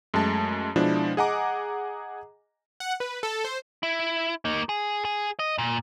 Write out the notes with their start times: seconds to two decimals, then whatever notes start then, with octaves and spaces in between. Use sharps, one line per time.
0.14 F#2 G#3 A3 A5
0.76 B2 F3 G#3 D4 E4
1.17 G#4 D#5 F#5 G#5 A#5 D6
2.80 F#5
3.00 B4
3.23 A4
3.44 C5
3.83 E4
4.45 A#3 D#4
4.69 G#4
5.05 G#4
5.39 D#5
5.58 A#2